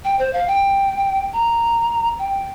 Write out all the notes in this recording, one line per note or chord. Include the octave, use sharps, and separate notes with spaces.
G5
C5
F5
G5
A#5
G5